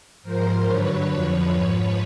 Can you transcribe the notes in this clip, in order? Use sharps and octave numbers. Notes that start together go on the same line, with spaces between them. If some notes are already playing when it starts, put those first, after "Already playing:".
G#2 F3 A#4 C5
G2 D3 F#3 B4 C#5
F2 D3 F3
G#2 F3 B4 C#5